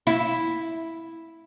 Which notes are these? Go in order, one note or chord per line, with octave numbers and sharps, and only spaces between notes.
E4